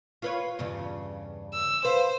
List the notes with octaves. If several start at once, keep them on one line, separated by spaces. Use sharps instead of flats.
F4 B4 C#5
E2 G2 C#3
E6
B4 C5 F5